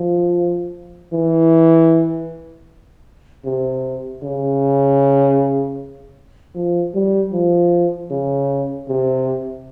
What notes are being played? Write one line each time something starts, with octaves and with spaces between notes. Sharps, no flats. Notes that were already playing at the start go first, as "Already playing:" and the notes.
Already playing: F3
E3
C3
C#3
F3
G3
F3
C#3
C3